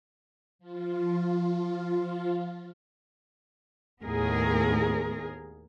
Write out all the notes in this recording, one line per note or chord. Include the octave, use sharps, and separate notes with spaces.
F3 F4
D#2 A2 B3 G#4 A#4